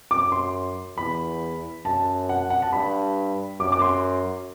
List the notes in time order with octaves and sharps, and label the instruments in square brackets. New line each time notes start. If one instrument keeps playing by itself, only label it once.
[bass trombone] F#2 [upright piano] D6
[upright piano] C6
[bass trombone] E2 [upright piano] B5
[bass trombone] F#2 [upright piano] A5
[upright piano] F#5
F#5
A5
[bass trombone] G2 [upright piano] B5
[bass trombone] F#2 [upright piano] D6
[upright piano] D6
C6